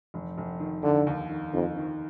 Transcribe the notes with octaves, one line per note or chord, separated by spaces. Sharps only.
F1
F1
D#3
D#2 D3
D#2
D#3
F2 D#3
D#3